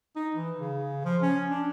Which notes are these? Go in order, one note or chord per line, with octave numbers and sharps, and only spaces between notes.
D#4
E3
C#3
F3
C#4
D4